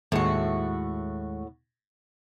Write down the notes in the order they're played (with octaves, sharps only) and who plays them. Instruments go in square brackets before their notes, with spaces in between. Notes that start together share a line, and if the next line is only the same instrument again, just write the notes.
[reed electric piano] D#2 G#3 C#6 [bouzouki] A2 F#4